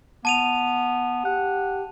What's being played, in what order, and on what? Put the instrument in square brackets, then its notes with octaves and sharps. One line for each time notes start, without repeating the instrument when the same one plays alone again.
[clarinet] B3 [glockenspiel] A5 D#7 F7
[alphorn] G4 [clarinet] F#5